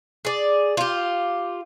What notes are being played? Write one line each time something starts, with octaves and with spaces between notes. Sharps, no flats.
G#4 D5
F4 G4